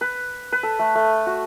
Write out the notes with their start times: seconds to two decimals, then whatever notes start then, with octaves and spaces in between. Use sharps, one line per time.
0.01 B4
0.52 B4
0.63 A4
0.79 A3
0.95 A3
1.27 F#4